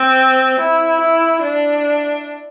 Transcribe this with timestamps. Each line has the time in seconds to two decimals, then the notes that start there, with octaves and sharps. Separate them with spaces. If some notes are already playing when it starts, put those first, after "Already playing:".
Already playing: C4
0.60 E4
1.01 E4
1.42 D4